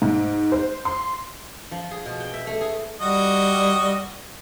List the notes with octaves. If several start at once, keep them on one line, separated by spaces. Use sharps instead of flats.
G#2
C5
C6
F3
G#4
B2
G5
E5
A3
G#4
G3 F#4 D#5